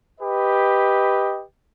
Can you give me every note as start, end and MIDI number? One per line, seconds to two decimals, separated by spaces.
0.21 1.43 67
0.21 1.43 71
0.21 1.43 75